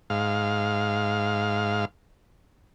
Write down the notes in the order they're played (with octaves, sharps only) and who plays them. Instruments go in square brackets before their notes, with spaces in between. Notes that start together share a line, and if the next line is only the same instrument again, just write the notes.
[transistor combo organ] G#2 F5